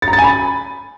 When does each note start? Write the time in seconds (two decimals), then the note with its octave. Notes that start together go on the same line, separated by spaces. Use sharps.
0.02 A6
0.08 A#5
0.13 A6
0.18 G#5
0.24 B5